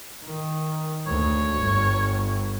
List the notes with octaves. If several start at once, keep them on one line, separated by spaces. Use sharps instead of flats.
D#3
D2 C#5
G1